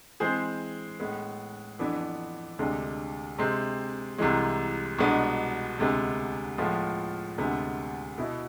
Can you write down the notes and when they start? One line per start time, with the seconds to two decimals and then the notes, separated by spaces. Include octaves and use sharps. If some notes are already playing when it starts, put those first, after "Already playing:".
0.20 E3 G#3 C4 G#4 C5
1.00 A2 G#3 B3
1.79 F2 E3 B3 D4
2.59 D2 C3 G#3 D4
3.38 C3 G#3 C4
4.18 C2 C3 E3 G#3
4.99 C2 B2 G#3 B3 D4
5.79 D2 C3 G#3 B3
6.58 A2 F3 G#3 B3 F4
7.38 D2 C3 G#3 B3
8.18 B2 B3 E4